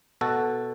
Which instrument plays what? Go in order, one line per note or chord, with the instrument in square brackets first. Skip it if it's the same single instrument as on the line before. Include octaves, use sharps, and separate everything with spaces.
[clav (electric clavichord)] B2 F#4 A4